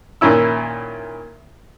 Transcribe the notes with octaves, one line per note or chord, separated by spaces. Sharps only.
A#2 D#3 C#4 E4 E6